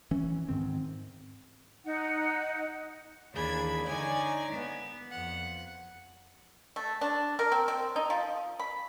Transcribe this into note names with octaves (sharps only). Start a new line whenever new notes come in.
E3 C#4
G#2 D#3 C4
D#4 F#5
D#2 E3 D4 G#4 B5 G#6
D3 D#4 C#5 D5 G#5 G#6
B3
F2 F#5
A3
D4
A#4
C4
C4
D#4
F3
B5